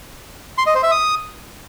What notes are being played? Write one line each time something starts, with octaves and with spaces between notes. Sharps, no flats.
C6
D#5
C5
E5
D#6